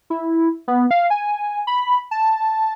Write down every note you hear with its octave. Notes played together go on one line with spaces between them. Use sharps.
E4
B3
F5
G#5
B5
A5